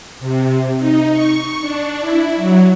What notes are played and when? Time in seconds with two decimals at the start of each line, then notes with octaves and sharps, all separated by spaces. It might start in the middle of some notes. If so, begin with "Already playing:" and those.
0.20 C3
0.78 D#4
1.11 C#6
1.61 D4
2.00 E4
2.35 F#3